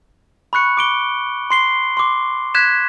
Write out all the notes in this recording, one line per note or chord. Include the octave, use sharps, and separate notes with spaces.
B5 C#6 F#6 C#7
D6 D7 G7
C6 C7 G7
C6 D6
F#6 G#6 B6 E7